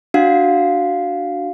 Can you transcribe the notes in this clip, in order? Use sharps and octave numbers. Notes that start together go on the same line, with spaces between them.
D4 F#4 F5 F#5